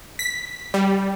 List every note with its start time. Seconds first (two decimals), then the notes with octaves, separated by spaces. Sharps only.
0.19 B6
0.74 G3